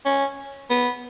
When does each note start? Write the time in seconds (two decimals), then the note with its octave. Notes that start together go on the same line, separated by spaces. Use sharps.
0.05 C#4
0.70 B3